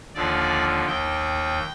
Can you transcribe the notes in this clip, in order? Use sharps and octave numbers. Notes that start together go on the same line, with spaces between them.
D#2 D3 F3 D5
D#2 D#3 G5